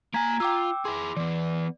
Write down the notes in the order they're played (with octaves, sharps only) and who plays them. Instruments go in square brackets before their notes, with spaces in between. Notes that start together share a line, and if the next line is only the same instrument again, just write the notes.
[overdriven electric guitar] A#3 G#5 [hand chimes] A#5 G#6 B6
[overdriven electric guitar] F4 [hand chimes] G5 D6 E6
[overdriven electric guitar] E4 G#4 [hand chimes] C6 D6
[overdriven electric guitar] E3 B3 [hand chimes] D5